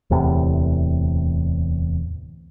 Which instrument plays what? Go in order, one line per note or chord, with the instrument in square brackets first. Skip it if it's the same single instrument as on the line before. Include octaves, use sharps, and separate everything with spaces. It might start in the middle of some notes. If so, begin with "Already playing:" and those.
[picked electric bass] D1 E2 A2 C3